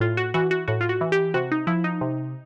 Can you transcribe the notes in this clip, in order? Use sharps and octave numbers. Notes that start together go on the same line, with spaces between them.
A2 F4
F#4
E3 F#4
F#4
A2 F#4
F4
F#4
E3
G4
C3 F#4
D#4
F3 E4
D#4
C3